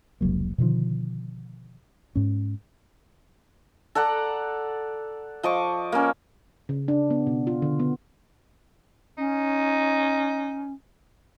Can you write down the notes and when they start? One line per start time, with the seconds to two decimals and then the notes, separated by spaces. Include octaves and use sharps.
0.21 F1 C#2 F#3 A#3
0.58 B2 D3 D#3 F3
2.15 G#2 C#4
3.95 A4 D5 F#5 A#5
5.43 F3 D#5 C#6 D6
5.92 A#3 C#4
6.69 C#3
6.88 D4
7.11 B3
7.27 B2
7.47 F4
7.62 D3
7.80 B3
9.18 C#4 D#4